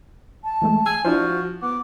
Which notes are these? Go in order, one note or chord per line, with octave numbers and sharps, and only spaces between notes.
A5
E3 G#3 A3
G#5 E6
F3 D4 E4 F#4 C5
B3 D6